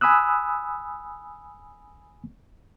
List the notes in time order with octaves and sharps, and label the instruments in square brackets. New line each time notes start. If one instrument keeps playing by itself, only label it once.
[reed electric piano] G#5 B5 D#6 E6 F#6